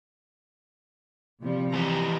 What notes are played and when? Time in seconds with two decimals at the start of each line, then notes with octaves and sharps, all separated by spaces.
1.42 C3 F3 G3
1.74 E3 G4 A#5